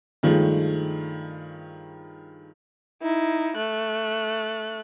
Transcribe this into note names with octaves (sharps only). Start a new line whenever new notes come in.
G2 D#3 F3 G#3 A3
D#4 E4
A3 F#6